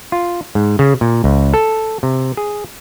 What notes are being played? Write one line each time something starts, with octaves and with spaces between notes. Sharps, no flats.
F4
G#2
C#3
A#2
C#2
A4
C3
G#4